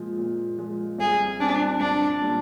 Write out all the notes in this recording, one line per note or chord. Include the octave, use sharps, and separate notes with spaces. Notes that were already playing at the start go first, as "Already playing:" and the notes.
Already playing: A#2 F3 G#3
A#2
F3 G#3
C2 G#4
A#2 G3 C4 D4
C2 D4
A#2 G3 C4